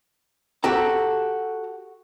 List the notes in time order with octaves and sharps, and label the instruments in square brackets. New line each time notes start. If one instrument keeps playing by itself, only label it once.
[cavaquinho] F#4 [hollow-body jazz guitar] G4 A4 A#5